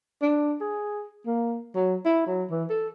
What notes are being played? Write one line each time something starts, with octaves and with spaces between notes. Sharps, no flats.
D4
G#4
A#3
F#3
E4
F#3
E3
A4